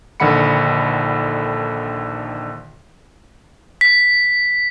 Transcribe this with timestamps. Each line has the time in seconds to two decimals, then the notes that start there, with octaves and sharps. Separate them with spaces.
0.20 A#1 D3 D#3 F#5 B5 C#7
3.81 B6